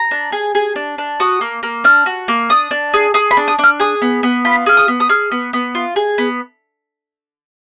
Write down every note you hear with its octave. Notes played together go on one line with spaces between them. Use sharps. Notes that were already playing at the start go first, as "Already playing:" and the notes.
Already playing: A#5
D4
G#4
G#4
D4
D4
F#4 D#6
A#3
A#3
D4 F6
F#4
A#3
D4 D#6
D4
G#4
G#4 D#6
B5
D4
D#6
D4
F6
G#4 D#6
B3
B3
F4 B5
G#4 F6
D#6
B3
D#6
G#4 F6
B3
B3
F4
G#4
B3